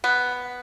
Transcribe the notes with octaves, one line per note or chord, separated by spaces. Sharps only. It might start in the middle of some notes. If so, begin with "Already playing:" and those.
B3